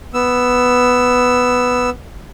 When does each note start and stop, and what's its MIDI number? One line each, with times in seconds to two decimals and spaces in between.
0.14 1.90 59
0.14 1.90 88